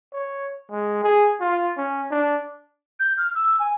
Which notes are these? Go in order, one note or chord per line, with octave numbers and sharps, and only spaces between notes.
C#5
G#3
G#4
F4
C#4
D4
G6
F6
E6
G#5